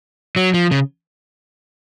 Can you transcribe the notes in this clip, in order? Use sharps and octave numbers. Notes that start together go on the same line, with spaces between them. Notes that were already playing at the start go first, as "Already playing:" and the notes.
F#3
F3
C#3